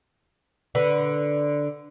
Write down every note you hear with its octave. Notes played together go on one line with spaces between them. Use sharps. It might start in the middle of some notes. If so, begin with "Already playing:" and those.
D3 B4